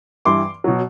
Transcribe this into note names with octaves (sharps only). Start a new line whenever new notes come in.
G2 E3 G3 C6 D6
B2 F#3